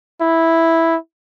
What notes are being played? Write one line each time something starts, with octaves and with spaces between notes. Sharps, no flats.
E4